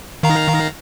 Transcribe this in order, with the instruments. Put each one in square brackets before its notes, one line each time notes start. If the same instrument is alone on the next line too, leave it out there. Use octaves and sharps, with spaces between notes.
[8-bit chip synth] D#3 F5 A#5